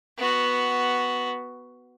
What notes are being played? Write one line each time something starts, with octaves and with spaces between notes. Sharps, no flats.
B3 F#4